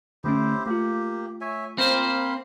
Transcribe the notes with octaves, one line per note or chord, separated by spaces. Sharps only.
D3 A3 C#4 E4 G4 C5
A3 A#3 F4 G4
C#5 E5 G#5
A#3 C4 C5 F5 B5